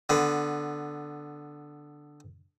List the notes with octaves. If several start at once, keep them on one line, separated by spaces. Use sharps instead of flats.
D3 B3